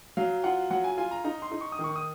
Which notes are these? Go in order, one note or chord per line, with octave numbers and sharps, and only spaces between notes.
F#3 F5
F4 F#5
F#3 F#5
G#5
F4 G#5
A#5
D#4 A#5
C6
D#4
C#6
D#6
D#3
C#6
D#6